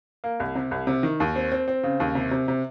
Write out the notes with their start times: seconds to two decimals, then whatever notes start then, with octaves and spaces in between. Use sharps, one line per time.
0.24 A#3
0.40 C2
0.55 C3
0.71 C2
0.87 C3
1.03 D#3
1.20 D#2
1.36 C4
1.52 C4
1.68 C4
1.83 C#3
2.00 D#2
2.15 C3
2.31 C3
2.48 C3